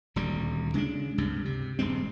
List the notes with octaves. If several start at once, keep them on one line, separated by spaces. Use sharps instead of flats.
D#1 D2 G3
C#3 G#3 C4 D4
C#2 G2 C3
C3
D#1 G2 G#3 C4